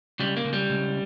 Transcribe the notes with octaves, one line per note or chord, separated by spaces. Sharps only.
C#2 G3
A#3
C#2
G3
C#2